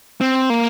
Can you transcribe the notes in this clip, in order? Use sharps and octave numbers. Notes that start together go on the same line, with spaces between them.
C4
A#3